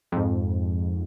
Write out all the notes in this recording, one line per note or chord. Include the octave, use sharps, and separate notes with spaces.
F2 G#2